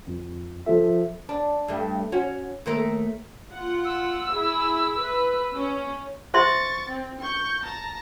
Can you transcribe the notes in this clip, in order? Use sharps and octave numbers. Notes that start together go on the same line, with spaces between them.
F2
F3 A4 E5
D4
G2 A3
C#4 F#4
D#2 A3 A#4
F4 F#5
E6
E4 G#4
B4
C#4
C5 E5 C6 C#6 A6
C4
C#6 G6
A5 A#5